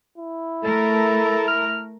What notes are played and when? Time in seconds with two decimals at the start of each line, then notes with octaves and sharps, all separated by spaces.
0.18 E4
0.64 A3 A4 A#4
1.48 F6